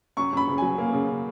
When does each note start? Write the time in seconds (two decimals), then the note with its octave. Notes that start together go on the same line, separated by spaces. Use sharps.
0.17 F#2 C#6
0.33 F#2 B5
0.48 C#3
0.58 F#3 G#5
0.78 A#3
0.93 C#3